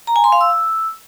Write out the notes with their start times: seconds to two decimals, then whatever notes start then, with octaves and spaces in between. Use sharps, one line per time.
0.07 A#5
0.16 G#5
0.24 C6
0.32 F5
0.41 E6